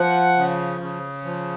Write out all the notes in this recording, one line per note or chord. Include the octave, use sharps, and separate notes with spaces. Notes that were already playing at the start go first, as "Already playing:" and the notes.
Already playing: F3 F#5
C#3
C#3
F3